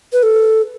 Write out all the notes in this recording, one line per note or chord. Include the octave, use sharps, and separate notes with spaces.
B4
A4